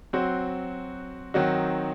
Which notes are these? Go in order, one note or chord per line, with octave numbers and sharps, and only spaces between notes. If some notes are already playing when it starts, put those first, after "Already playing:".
F#3 C4 F#4 C5
D#3 F#3 C4 D#4 F#4